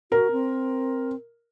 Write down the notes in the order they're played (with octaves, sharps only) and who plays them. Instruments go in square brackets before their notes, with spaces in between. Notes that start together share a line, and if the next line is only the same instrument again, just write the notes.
[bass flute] F#4 [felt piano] A#4
[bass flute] C4